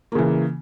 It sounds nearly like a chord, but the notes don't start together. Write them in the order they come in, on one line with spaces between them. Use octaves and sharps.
A#3 C#3 E3